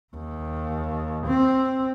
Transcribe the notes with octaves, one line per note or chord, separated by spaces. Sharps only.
D#2
C4